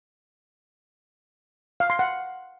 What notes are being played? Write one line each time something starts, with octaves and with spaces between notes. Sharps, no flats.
F5
C6
F#5